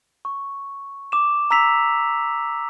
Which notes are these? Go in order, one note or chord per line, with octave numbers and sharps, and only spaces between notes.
C#6
D6 E7
A#5 E6 B6 F7